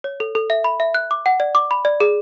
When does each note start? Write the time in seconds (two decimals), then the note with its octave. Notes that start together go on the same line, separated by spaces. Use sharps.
0.04 C#5
0.20 A4
0.35 A4
0.50 E5
0.64 B5
0.80 E5
0.95 F#6
1.11 D6
1.26 F#5
1.40 D5
1.55 D6
1.71 B5
1.85 D5
2.00 G#4